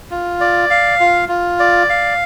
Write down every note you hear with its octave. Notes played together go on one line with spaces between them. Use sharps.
F4
D5
F5
F4
F4
D5
F5